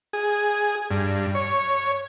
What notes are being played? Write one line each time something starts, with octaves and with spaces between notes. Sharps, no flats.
G#4
G2
C#5